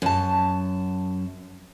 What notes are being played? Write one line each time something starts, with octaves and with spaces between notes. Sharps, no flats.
F#2 A5